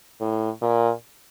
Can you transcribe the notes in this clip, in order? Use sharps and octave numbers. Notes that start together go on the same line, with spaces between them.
A2
A#2